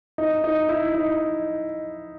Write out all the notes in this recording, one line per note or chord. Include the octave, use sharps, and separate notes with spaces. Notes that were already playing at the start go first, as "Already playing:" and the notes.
D#4
D#4
E4
D#4